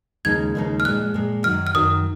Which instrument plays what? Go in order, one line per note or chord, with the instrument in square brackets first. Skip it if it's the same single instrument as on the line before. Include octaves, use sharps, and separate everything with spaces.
[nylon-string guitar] D#2 C#3 F3 G#3 D#4 [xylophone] G#6
[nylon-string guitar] D#2 C#3 F3 G#3 D#4
[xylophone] F6
[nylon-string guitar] A#2 F3 G#3 [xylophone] F#6
[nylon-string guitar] A#2 F3 G#3
[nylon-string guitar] F#2 D#3 F#3 [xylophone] F6
[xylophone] F6
[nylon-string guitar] F#2 D#3 F#3 [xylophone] D#6